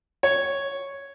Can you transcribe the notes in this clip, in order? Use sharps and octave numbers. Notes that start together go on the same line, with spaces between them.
C#5